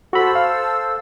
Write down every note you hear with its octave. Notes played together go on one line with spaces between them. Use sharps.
F#4 A4 C5 B5 E6
F5